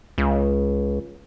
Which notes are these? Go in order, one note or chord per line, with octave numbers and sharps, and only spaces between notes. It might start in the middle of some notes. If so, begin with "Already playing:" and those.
C#2